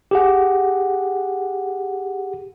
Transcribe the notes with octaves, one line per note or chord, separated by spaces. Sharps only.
G4 G#4 F#5